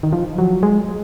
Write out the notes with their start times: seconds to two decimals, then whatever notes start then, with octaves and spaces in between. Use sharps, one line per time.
0.03 D#3
0.13 F3
0.38 F#3
0.63 G#3